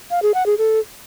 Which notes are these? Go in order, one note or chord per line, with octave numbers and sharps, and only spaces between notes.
F5
G#4
F#5
G#4
A4